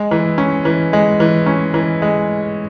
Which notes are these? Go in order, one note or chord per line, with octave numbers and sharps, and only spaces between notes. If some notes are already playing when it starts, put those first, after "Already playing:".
Already playing: G#3
E3
C#4
E3
G#3
E3
C#4
E3
G#3